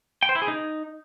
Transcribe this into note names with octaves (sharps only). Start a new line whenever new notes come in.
G5
C5
E4
G#4
D#4